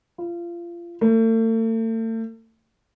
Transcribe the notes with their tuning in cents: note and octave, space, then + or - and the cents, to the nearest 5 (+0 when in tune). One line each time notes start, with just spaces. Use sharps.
F4 -25
A3 +40